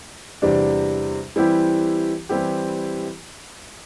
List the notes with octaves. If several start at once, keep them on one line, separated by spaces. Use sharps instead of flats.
E2 C3 G3 D4
E3 G3 C4 E4 G4
E3 G3 C4 E4 G4